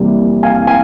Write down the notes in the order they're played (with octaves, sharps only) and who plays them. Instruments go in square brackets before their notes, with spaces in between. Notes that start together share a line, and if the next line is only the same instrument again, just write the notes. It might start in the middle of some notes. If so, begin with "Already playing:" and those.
Already playing: [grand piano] F2 C3 E3 G3 A#3
F5 G#5
F5 G#5